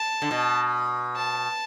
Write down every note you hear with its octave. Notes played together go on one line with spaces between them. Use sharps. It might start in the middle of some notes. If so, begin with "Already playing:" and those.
Already playing: A5
D3
B2
A5